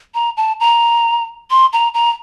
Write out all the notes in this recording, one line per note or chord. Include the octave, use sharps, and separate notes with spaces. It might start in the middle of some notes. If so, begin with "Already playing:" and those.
A#5
A5
A#5
C6
A#5
A#5